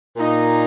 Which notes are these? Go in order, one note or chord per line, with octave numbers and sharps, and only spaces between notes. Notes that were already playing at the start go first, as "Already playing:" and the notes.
A#2 A#3 D#4